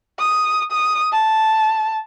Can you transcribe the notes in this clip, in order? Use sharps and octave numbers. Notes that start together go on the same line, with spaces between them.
D#6
D#6
A5